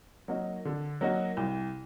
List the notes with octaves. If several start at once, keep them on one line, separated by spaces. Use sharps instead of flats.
F#3 A#3 D#4 F#4
D3
F#3 A#3 D#4 F#4
C2